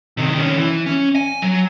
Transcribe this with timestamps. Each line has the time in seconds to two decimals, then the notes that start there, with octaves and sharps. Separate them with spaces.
0.17 C3 D#3
0.34 D#3 C#4
0.56 E3
0.86 C#4
1.16 G#5
1.42 F#3